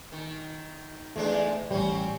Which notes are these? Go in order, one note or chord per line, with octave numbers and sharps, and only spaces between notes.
D#3
E2 G#3 A3 D4
A1 G3 C4 C#4